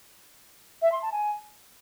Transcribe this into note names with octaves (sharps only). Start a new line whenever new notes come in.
E5
C6
A5
G#5